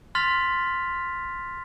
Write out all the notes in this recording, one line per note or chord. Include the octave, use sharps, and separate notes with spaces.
C6 F6 A6 B6 F7